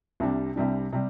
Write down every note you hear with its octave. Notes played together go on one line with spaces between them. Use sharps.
C2 C3 G3 D4
C2 C3 G3 D4
C3 G3